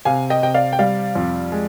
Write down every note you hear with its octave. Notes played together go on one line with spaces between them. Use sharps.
C3 F5 G#5
D#5 G5
C3 G5
D5 F5
G5
G3 D5 F5
F2
G#3